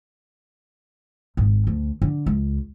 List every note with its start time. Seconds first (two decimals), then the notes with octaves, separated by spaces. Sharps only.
1.37 G#1
1.67 D2
2.02 D3
2.26 C#2